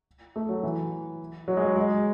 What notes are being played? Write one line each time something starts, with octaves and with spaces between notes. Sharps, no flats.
A3
F#3
E3
F#3
G#3
F#3
G#3